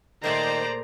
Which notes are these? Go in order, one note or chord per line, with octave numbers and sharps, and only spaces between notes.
A#2 D#3 A3 G#4 C5 D5 A#5